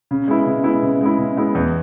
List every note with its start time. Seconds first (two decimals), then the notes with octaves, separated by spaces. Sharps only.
0.11 C#3
0.28 G#3 B3 E4
0.46 C#3
0.64 G#3 B3 E4
0.83 C#3
1.01 G#3 B3 E4
1.18 C#3
1.37 G#3 B3 E4
1.55 E2